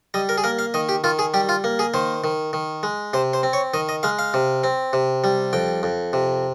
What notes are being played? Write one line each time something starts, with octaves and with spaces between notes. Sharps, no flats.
G3 D#5
A#4
G#4
A#3 A#4
F5
D#3 D#5
G4
D#3 F4
G#4
G3 G4
F4
A#3
G#4
D#3 C5
D#3
D#3
G#3
C3 C5
C5
C4
C#5
D#3 D#5
D#5
G#3 F5
F5
C3
C4
C3
G3
F2 G5
F2
C3